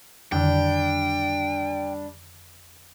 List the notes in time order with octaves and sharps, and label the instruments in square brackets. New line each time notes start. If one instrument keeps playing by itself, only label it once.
[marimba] F2 D3 D#3 [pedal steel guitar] G3 D4 [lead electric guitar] G5